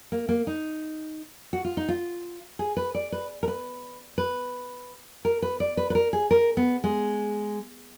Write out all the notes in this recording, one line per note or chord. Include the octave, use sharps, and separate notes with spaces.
A#3
A#3
D#4
F#4
F4
D#4
F4
G#4
B4
D5
B4
A#4
B4
B4
A#4
B4
D5
B4
B4
A#4
G#4
A#4
B3
G#3